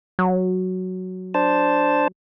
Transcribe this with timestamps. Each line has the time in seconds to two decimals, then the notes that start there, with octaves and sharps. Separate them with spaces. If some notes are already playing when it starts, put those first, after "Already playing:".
0.19 F#3
1.34 D4 C5 A5